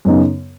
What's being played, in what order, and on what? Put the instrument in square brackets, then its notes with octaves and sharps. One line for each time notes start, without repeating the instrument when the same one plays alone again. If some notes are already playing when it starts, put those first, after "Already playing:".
[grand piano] F#2 C#3 F#3 B3 D#4